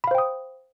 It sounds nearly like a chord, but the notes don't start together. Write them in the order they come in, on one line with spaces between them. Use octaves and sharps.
B5 F5 C5 G5 D#6